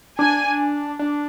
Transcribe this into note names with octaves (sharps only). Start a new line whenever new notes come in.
D4 G#5
D4